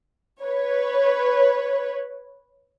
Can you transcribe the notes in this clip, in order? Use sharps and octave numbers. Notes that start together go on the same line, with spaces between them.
B4 C#5